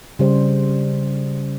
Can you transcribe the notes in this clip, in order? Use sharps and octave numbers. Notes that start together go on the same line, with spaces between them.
C#3 G3 C5